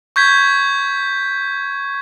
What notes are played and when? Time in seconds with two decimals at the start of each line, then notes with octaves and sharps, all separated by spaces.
0.16 C#6 G6 G#6 B6